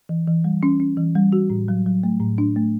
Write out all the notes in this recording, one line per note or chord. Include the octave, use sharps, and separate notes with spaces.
E3
E3
G3
C#4
C#4
E3
G3
F#4
A2
F#3
F#3
A3
A2
D4
A3